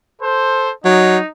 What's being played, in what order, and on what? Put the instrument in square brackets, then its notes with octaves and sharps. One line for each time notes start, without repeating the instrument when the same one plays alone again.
[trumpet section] A4 C5
[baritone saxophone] F#3 [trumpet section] D#4